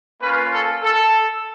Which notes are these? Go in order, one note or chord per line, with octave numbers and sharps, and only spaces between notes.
A#3 C#4 F4 B4
A4
A4